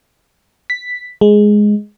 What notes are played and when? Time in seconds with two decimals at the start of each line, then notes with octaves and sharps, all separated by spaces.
0.70 B6
1.21 G#3